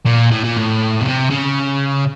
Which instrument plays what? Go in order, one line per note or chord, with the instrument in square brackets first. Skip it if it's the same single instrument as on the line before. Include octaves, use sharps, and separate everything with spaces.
[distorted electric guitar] A#2
A2
A#2
A2
B2
C3
C#3